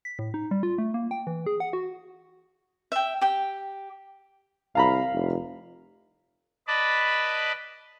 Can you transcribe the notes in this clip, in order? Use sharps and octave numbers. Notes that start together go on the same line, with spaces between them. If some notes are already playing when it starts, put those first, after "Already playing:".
B6
A2
D#4
G3
F4
A3
A#3
G5
E3
G#4
F#5
F#4
E5 G5
G4 G5
C2 F5 A#5 B5
F1
B4 D5 D#5 A5 B5